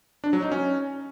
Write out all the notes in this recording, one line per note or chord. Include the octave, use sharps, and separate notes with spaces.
D4
F#3
D#4
C#4